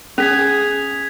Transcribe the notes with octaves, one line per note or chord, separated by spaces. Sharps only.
C#4 G#4 G#6 B6 F7